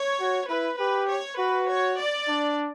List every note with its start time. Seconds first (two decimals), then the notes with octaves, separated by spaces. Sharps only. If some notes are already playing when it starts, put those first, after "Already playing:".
Already playing: C#5
0.20 F#4
0.49 E4 B4
0.79 G4 B4
1.10 C#5
1.39 F#4 B4
1.70 C#5
1.99 D5
2.29 D4